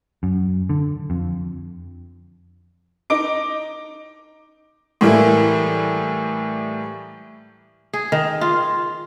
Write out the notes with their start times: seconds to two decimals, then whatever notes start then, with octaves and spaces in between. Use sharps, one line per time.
0.23 F#2
0.69 D3
1.10 F2
3.10 D#4 D6 D7
5.01 A2 E3 G3 A#3 E4
7.93 G#4
8.12 D#3
8.41 F4